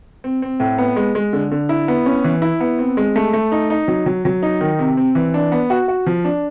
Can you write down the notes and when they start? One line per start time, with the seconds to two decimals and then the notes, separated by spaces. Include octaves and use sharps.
0.24 C4
0.42 C4
0.60 A2
0.78 B3
0.96 G#3
1.15 G#3
1.33 D3
1.51 D3
1.69 E4
1.88 B3
2.06 C#4
2.24 E3
2.42 E4
2.61 B3
2.79 C4
2.97 G#3
3.16 A3
3.33 A3
3.52 D#4
3.70 D#4
3.88 F#3
4.06 F#3
4.25 F#3
4.43 D#4
4.61 D#3
4.79 C3
4.97 C4
5.15 E3
5.34 D4
5.52 B3
5.70 F#4
5.88 F#4
6.06 F3
6.25 D4